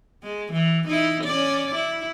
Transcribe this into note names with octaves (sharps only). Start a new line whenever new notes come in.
G#3
E3
D#4 E4
C#4 D5
E4